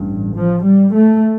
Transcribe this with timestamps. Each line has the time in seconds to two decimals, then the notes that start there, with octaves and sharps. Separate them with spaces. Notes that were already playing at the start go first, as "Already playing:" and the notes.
Already playing: A1 G2
0.34 F3
0.63 G3
0.94 A3